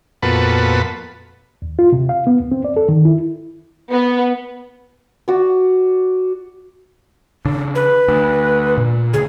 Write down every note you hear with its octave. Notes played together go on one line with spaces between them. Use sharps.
F2 A#2 B3 F#4 A4 B4
D#2
F4
C3
F5
B3
D2
C4
D5
A4
D#3
E4
B3
F#4 D5
C#3 D4
B4
D2
A#2
D2 C#3 G#4